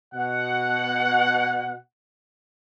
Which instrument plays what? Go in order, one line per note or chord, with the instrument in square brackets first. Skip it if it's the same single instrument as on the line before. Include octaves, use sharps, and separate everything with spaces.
[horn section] B2 F#5